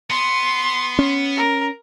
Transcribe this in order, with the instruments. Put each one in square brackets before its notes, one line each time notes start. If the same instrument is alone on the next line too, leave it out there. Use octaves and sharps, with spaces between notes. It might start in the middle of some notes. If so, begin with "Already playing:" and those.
[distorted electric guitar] B3 [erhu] C6
[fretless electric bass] C#4
[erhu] A#4